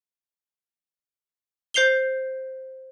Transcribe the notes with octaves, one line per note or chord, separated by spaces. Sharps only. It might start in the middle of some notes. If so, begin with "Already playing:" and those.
C5 G6 C7 F7 G7